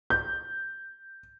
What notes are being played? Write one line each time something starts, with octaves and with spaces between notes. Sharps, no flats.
G6